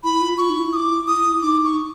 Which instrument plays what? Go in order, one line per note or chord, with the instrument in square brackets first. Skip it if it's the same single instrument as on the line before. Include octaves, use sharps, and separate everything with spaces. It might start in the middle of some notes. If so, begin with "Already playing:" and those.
[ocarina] E4 [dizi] B5
[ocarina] F4
[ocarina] F4 [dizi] C#6
[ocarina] D#4
E4
[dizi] D#6
D6
D#6
[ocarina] D#4 [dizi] D6
[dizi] C#6